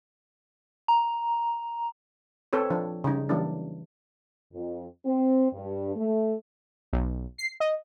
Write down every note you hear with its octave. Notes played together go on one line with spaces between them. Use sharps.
A#5
C4 A4 B4 C#5
F3 D4
C#3 G3 D#4
E3 F#3 G3 A#3 C#4 D4
F2
C4
G2
A3
B1
C7
D#5